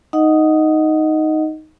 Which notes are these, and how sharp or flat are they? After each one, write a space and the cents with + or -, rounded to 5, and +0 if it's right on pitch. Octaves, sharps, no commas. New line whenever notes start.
D#4 +0 D#5 +0 F#5 +0